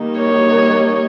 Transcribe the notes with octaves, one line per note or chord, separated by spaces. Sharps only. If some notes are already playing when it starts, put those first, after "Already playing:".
Already playing: D#3 G3 A#3 D#4
C#5